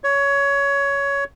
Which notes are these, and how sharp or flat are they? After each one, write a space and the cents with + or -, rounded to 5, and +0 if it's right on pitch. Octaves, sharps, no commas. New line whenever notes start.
C#5 +15